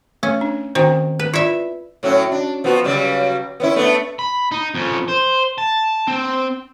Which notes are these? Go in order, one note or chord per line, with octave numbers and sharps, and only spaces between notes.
A3 C#4
D4
D#3 C4 F#4 C5
B4
E4 F4 D5 E5
A2 F#3 C#4
D4
F3 B3 F#4
C#3 F#3 G3
B3 C#4 E4
A3 B3 D4
B5
D#4
F2 C#4
C5
A5
C4